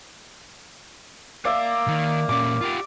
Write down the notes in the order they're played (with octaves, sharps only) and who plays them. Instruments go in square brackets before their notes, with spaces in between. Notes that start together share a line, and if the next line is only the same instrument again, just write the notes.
[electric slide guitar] A#4 F5 [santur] D5 E5
[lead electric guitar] D#3
[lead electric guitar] A#2 C#4 [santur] D6
[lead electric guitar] F4 G4